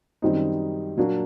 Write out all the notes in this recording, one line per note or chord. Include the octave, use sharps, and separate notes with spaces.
F#2 D#3 G3 C4 D#4
A#2 F#3 A#3 D4